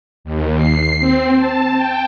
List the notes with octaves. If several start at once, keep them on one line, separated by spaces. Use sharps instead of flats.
D#2
C7
C4
A5
G5